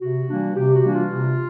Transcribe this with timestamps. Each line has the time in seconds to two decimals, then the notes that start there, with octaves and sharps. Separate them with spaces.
0.01 C3 F#4
0.29 E3 G3 A#3 D4
0.56 C3 G4
0.75 F#4
0.83 E3 G3 A#3 D4
0.94 F4
1.11 C3